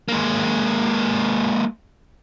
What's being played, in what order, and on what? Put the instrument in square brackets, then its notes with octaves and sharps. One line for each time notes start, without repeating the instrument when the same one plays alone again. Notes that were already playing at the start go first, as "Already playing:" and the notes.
[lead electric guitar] G#3 A#3